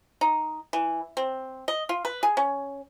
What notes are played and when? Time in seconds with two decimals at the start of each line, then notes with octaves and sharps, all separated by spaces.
0.21 D#4
0.73 E3
1.17 C4
1.68 D#5
1.89 F4
2.05 B4
2.23 G#4
2.37 C#4